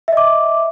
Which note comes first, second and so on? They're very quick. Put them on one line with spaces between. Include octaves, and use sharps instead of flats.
E5 D#5 D6